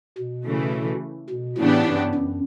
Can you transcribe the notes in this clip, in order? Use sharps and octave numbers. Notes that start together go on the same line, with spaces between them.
B2
C#3 E3 A3
B2
A2 C#3 E3 B3 D4 G4
G2
F#2